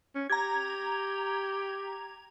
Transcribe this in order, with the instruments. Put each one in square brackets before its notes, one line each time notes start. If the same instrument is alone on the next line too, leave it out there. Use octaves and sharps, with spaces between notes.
[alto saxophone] C#4
[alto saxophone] G4 [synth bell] A#5 G#6